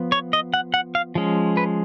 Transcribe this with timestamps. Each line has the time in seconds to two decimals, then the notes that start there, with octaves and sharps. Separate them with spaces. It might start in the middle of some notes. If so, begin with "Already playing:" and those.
Already playing: F3 B3
0.12 C#5
0.33 D#5
0.54 F#5
0.74 F#5
0.95 F5
1.15 F3 G#3 C#4
1.57 B4